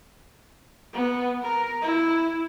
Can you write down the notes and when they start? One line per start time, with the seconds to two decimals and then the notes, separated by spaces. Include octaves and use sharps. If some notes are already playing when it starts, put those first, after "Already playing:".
0.93 B3
1.42 A#4
1.82 E4